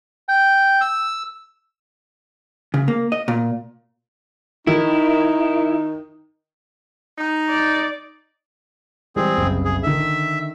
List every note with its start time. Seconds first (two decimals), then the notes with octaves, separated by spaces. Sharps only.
0.29 G5
0.81 E6
2.74 C#3
2.88 A#3
3.12 D#5
3.28 A#2
4.67 D#3 D#4 E4
7.18 D#4
7.50 D5
9.16 E3 G3 G#3 C4 G#4
9.37 F#1 C2
9.65 G#4
9.83 D3 D#3 E5